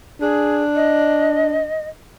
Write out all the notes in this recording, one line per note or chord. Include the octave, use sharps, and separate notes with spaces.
D4 G#4
D#5